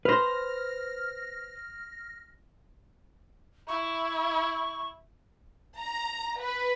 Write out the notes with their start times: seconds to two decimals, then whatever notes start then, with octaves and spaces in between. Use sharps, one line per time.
0.05 B4 C5 F6 A#6
3.68 E4 C#6
5.78 A#5
6.38 B4